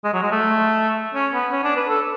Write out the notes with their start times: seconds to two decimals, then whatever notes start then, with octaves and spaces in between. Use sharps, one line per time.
0.04 G#3
0.14 F#3
0.22 G#3
0.32 A3
1.15 C#4
1.34 B3
1.52 C#4
1.64 D4
1.77 B4
1.89 A4